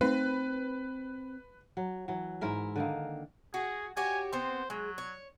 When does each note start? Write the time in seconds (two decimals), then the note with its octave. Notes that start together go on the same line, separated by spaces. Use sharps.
0.01 A3 C4 D#4 B4
1.77 F#3
2.08 E3 F#3
2.41 G#2 E4 A#4 E5
2.76 D3 D#3 A#3
3.54 F#4 G#4
3.97 F#4 G4 C#5 G#5
4.33 B3 C4 C5
4.70 F#3 G#3
4.98 C#5